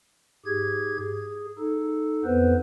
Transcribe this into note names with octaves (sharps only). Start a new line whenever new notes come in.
G#2 G4 G#4 G#6
G#4
D#4 A4
F2 B3 B4 C5